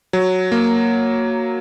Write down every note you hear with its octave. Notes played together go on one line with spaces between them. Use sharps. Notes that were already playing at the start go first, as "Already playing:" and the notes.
F#3
A#3